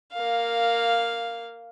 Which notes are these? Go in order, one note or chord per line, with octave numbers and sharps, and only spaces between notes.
A#3 F5